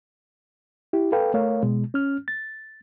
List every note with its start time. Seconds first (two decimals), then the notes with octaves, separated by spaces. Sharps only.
0.93 E4 G4
1.12 A4 B4 F5 G5
1.34 A3 A#4 C#5 F5
1.63 B2 G#3
1.94 C#4 F6
2.28 A6